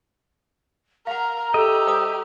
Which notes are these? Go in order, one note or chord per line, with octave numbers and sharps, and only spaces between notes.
A#4 F5 F#5 A#5
G4 A4 D#5 E5
C5 D5 D#6